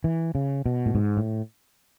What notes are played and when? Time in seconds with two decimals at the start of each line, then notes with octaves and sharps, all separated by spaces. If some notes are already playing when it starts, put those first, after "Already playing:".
0.04 E3
0.35 C#3
0.66 B2
0.86 A2
0.95 G#2
1.17 A2